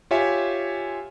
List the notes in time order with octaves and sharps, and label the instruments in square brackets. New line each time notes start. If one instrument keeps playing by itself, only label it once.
[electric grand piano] F4 G4 C#5 E5 G#5